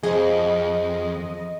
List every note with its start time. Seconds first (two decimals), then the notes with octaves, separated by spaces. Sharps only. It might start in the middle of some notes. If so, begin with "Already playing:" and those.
0.03 F2 G#4 C5 D#5